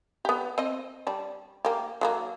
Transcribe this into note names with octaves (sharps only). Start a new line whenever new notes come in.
B3 G4
C4 D#5
G3 D4
A#3 G4
F#3 A3 A#3